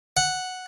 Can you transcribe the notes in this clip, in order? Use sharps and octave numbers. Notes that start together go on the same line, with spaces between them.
F#5